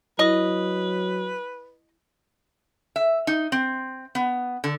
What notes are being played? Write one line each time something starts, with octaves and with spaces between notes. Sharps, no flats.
F#3 E4 B4 D#5
E5
D#4
C4
B3
D3